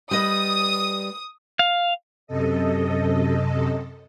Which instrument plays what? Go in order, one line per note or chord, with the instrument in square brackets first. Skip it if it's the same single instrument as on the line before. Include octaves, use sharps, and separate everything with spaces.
[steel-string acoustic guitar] G3 B4 D#5 [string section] D#6
[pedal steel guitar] F5
[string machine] F#2 C3 A4 D#5